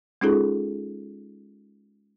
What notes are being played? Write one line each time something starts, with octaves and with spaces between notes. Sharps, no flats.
G#3 C#4 D#4 F4 G#4 A4